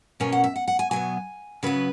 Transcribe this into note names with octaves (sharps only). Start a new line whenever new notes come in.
B2 A#3 C#4 G#5
F#5
E5
F#5
F#5
G#5
B2 F#3 B3 G#5
C#3 F#3 B3 B4